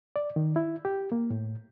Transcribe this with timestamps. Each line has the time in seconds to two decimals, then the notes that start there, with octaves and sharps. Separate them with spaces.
0.16 D5
0.36 D#3
0.56 E4
0.85 G4
1.12 A#3
1.31 A2